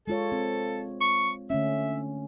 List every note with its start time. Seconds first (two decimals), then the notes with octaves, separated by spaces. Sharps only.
0.07 G#3 F4 A4 C#5
0.32 C4
1.01 C#6
1.50 D3 A3 C#4 E5